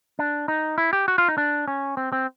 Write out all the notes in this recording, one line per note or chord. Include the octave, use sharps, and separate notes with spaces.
D4
D#4
E4
G4
F#4
F4
D#4
D4
C#4
C4
C4